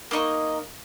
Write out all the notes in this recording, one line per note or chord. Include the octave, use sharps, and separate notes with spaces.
A#3 D#4 D#5 C#6